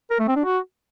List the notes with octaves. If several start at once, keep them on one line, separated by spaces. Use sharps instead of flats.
A#4
A3
C4
D4
F#4